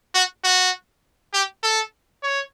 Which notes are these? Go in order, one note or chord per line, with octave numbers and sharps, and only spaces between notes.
F#4
F#4
G4
A4
C#5